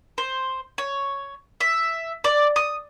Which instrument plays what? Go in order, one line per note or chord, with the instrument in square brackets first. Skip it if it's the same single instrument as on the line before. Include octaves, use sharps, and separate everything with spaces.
[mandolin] C5
C#5
E5
D5
D#6